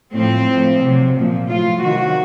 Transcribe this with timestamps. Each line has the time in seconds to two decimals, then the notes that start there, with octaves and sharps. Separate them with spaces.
0.14 A2 F3 C4
0.49 A2 F3
0.82 C3 F#3
1.16 A#2 F3
1.49 A2 F#3 F4
1.83 C3 D#3 F#3 F#4